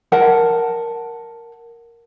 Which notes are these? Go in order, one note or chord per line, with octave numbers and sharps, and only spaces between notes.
A#4 F#5 A5